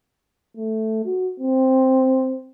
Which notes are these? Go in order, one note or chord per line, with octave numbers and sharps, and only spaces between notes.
A3
F#4
C4